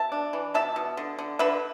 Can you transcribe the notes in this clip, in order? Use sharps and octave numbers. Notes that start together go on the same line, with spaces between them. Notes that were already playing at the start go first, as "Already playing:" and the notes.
Already playing: B2 E5 A5
D4
E3
B2 E5 A5
B2
D3
D3
D3 B4 E5